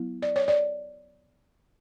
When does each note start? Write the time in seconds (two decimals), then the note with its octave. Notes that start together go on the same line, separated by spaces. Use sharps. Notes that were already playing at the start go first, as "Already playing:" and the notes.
Already playing: F#3 B3 E4
0.22 D5
0.36 C#5
0.48 D5